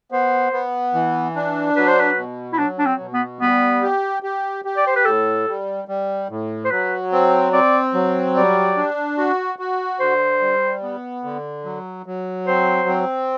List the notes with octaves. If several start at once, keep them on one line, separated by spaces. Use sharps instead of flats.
B3 C5
B3
E3
D4
F#3 B4
C5
B4
B2
E4
F#3 D4
D4
C4
B2
B3
G3 B3
G4
G4
G4
D5
C5
B4
A2 A4
G3
G3
A2
C5
F#3 B4
C4
C4 D5
F#3
G3 D5
D4
F#4
F#4
D3 C5
G3
B3
D3
F#3
F#3
C4 C5
C4